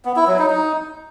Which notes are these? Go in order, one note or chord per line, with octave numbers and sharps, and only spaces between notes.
B3
E4
F#3
D#4
D#4